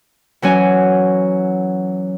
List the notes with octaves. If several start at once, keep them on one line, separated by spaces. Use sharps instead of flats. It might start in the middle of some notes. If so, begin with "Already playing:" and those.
E3 F#3 C#4 G#5